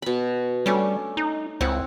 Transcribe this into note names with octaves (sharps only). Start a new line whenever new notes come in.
B2 B5
G3 A3 C#4 D4
D#4
C#2 C4 E4 F#5